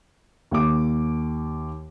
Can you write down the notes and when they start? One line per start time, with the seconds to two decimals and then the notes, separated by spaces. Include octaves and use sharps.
0.51 D#2 D6